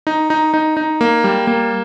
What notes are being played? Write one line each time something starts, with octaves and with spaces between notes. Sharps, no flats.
D#4
D#4
D#4
D#4
A#3
G3
A#3